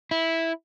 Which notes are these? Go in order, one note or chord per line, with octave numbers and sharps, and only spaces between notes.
E4